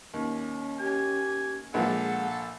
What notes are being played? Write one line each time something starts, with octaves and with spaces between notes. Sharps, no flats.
D#2 C#4
G4 G#5
A#1 F3 G#3 A4 F#5